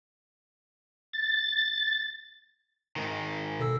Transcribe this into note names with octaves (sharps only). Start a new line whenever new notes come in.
A6
G#2 D#3
B2 A4 E6